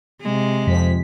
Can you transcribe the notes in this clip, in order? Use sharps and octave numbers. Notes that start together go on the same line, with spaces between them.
C3 G#3
F2 F3 B6